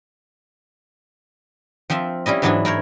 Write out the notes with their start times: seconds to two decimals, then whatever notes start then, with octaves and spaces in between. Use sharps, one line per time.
1.90 F3 C4 F4 E5
2.26 G3 C#4 E4 D#5
2.42 G#2 E3 F#3 B3 D4 E4
2.65 E4 A#4 C5 C#5